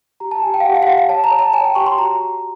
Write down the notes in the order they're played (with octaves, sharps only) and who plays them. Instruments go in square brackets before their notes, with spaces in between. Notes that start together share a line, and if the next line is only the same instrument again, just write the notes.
[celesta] G4 A#5
A5
G4 G#5
G5
F5
G4 F#5
F5
F#5
G4 F5
F5
C#5 A5
A#5
C#5
A5
C#5 G#5
G5
G4 C#6
C6
F#4 A#5